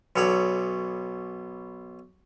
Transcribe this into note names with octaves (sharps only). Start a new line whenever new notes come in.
B1 B2 A4 C#5 D5